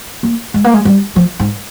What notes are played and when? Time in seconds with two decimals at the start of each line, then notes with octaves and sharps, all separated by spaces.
0.23 A#3
0.54 G#3
0.64 A#3
0.74 G#3
0.85 G3
1.16 F3
1.39 G#2